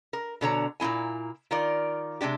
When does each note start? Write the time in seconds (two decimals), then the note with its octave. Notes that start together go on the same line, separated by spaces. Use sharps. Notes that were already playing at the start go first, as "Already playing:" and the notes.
0.13 A#4
0.41 B2 D3 C#5 A#5
0.80 A#2 A#3 C4 E4 G#5
1.51 D#3 F4 A#4 D5
2.21 C3 G#3 D4 G4